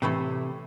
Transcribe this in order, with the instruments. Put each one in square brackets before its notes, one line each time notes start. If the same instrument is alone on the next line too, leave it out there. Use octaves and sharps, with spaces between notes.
[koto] A2 E3 A3 E4 A4 [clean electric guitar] C3